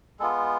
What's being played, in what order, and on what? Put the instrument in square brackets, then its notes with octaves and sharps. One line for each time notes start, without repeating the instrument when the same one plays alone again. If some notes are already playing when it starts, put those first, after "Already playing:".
[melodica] G#3 B3 F4 A4